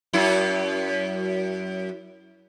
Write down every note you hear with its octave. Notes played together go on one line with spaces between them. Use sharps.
F#2 E4